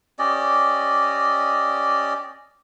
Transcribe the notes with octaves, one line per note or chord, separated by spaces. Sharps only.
C#4 G4 D5 D#5